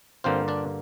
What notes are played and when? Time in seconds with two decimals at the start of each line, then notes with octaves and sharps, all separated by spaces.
0.24 G2 D3 A#3 C4 F4 C5
0.48 D4 D5